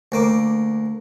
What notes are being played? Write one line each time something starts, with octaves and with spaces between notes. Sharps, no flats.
D2 A#3 D6